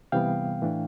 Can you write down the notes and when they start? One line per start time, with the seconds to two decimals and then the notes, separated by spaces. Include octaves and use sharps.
0.12 C3 E3 G3 B3 F5 G5
0.62 A2 E3 A3 D4